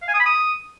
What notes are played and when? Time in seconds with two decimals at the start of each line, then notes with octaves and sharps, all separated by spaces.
0.02 F5
0.08 G#5
0.14 D#6
0.20 B5
0.26 D#6